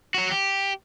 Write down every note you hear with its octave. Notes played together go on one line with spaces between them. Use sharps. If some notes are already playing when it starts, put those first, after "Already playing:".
F#3 F#4
G4